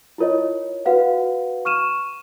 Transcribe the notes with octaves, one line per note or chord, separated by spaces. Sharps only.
E4 F4 A#4 C#5 D#5
F#4 B4 F5 F#5
C#6 F6 D#7 E7